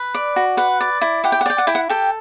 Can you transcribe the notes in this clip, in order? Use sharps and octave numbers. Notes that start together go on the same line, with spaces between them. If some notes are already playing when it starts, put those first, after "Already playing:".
Already playing: B4
D5
F#4
B4 F#5
D5
E4
G4 F#5
G5
F#5
D5 G5
F#5
E4 G5
F#5
G4 A4 G5